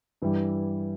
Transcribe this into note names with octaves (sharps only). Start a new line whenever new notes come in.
G2 E3 G3 E4